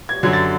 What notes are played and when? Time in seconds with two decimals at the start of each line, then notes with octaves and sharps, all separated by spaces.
0.09 G#6
0.23 F#2 D3 F#3 G#6
0.33 A6